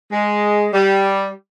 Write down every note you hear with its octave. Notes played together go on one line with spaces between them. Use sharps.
G#3
G3